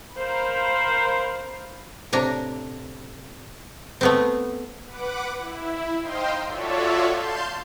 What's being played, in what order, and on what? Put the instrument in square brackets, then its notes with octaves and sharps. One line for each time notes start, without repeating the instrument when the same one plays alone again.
[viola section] A#4 C5 F5 B5
[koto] A2 C3 D4 A#5
A3 B3 C4
[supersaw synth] B4 F#5 D6
E4
D#4 C5 D#5 F5 G5 C6
F4 F#4 A4 C#5 D5 E5
F5 A5 C6 G6